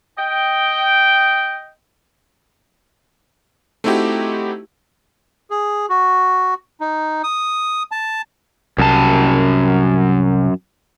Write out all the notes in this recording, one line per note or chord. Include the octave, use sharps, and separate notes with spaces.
D#5 G5
A3 C4 D#4 E4 F#4 G4
G#4
F#4
D#4
D#6
A5
C2 F#2 A5